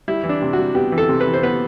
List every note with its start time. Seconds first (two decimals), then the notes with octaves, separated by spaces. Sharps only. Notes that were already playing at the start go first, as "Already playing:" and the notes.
0.08 G3 E4
0.24 E3
0.29 D4
0.42 C3
0.53 G3 F#4
0.75 B3 G4
0.92 E3
0.98 A4
1.09 C3
1.21 B4
1.26 E3
1.33 C5
1.43 B3 B4